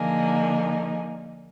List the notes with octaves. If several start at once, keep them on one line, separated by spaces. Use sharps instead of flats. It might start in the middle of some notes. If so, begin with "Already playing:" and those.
Already playing: D3 F3 A#3 D#4 G#4